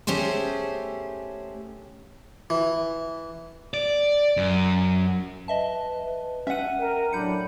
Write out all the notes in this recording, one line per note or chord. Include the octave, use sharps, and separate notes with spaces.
A3 C#4 G4 G#4 C5
E3
D5
F#2
B4 D#5 E5 A5
C#4 E5 F#5 D#7
A#4 G5
A2 F#3 D4 B5 G6 C#7